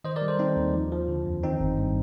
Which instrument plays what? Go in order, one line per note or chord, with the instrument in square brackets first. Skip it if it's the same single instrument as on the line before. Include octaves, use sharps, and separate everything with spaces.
[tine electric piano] D#3 C5 D#5
A#4 D5
G3
A4 C5
D#3 C4 D#4
D#2
F3
F3
D3
F2
D#3 C4 D#4
G1
G2